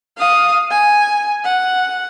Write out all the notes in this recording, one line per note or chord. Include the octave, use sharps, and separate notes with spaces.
F5 D#6
G#5
F#5